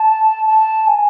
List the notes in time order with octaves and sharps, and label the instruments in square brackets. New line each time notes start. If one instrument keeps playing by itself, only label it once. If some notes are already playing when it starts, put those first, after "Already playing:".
Already playing: [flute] A5
A5
G#5